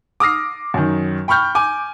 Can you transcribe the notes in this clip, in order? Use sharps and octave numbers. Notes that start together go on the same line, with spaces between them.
D6 D#6 F6 A#6 C7
F#2 D#3
G5 B5 C#6 F6 G6
G#5 D6